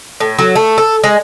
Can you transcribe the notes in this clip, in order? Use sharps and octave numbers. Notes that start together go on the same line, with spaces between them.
A2
F#3
A3
A4
G#3